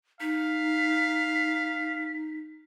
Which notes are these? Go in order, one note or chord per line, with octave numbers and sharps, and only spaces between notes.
D#4 F5 B6